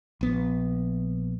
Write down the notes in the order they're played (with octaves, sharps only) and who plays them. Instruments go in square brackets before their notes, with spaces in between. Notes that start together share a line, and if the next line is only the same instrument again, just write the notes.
[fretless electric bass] A#1 B3